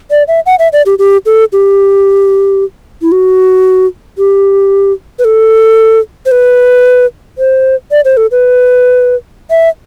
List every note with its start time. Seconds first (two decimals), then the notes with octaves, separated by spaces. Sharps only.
0.11 D5
0.28 E5
0.46 F#5
0.59 E5
0.73 D5
0.86 G4
0.99 G4
1.26 A4
1.53 G4
3.02 E4
3.12 F#4
4.18 G4
5.19 B4
5.25 A4
6.26 C5
6.31 B4
7.38 C5
7.91 D5
8.05 C5
8.17 A4
8.31 B4
9.50 E5